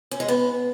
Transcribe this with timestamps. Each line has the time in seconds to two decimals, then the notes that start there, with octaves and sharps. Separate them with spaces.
0.11 C#4
0.20 G#3
0.28 B3